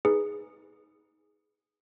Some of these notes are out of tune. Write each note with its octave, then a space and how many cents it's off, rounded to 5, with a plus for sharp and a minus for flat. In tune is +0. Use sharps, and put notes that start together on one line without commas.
D#4 +25 G#4 +0 B4 +0